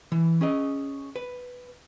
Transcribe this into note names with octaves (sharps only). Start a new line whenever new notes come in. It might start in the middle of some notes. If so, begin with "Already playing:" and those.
E3
C#4 G#4 D#5
B4